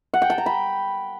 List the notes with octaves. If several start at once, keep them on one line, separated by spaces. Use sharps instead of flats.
F#5
G5
A5
A#5
B5